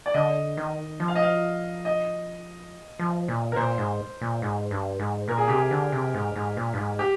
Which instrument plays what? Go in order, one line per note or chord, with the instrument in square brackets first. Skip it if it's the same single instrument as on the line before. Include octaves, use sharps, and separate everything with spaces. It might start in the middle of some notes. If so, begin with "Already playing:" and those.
[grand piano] D5
[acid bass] D3 [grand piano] D#5
[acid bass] D#3
F3
[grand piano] F5
D#5
F5
D#5
[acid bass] F3
A#2
[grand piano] A#4
[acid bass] A#2 [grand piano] C5
[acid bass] G#2
A#2
G#2
G2
G#2
[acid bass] A#2 [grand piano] A#4
[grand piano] G#4
[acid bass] C3 [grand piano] G4
[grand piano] G#4
[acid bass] D3
C3
G#2
G#2
A#2
G2
G#2
[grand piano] G4